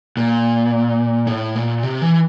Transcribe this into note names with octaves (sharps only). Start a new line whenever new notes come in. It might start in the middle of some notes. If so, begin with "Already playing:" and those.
A#2
A2
A#2
C3
E3